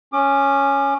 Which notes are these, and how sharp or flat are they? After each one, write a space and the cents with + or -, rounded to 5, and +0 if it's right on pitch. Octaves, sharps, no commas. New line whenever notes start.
C#4 +0 D6 +30